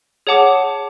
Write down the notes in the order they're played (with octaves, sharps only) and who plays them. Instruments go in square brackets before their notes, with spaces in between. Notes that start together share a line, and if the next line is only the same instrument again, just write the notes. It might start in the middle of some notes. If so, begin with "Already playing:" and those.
[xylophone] G#4 C#5 F#5 A5 D6